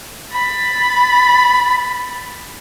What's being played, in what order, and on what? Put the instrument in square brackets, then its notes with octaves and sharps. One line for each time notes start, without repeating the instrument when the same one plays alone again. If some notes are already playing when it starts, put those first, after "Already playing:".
[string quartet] B5 A6